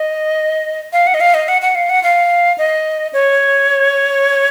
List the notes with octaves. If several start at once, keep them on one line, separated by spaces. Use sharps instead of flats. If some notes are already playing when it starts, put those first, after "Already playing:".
Already playing: D#5
F5
F#5
D#5
F5
D#5
F#5
F#5
F5
F#5
F5
D#5
C#5